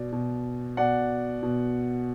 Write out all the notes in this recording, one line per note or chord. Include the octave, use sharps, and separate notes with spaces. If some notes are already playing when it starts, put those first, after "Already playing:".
Already playing: B2 D5
B2
B2 D5 F#5
B2